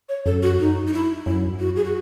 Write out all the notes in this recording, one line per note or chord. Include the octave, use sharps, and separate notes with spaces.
C#5
F#2 A4
F#4
D#4
D#4
E4
F#2 E4
F#4
G#4
F#4